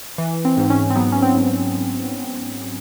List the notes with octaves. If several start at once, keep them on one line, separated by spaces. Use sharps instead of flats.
E3
C4
G#2
C#4
C4
F#3 B3
C#4
C4
G#2